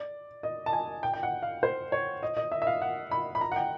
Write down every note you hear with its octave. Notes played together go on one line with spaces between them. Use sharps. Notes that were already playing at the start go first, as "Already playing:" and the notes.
Already playing: D5
D#5
A5
G#5
G5
G5
F#5
F5
C5
C#5
D#5
D#5
E5
E5
F5
F#5
B5
B5
A#5
F#5
G5